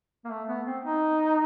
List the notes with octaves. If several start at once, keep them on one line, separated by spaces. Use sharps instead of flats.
A#3
A3
B3
C4
D#4